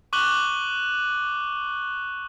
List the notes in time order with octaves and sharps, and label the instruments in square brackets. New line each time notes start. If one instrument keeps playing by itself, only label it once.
[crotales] C#6 D6 F#6 F#7 G7